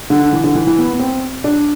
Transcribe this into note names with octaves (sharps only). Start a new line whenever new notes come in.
D3
E3
D3
E3
E3
B3
B3
C4
D4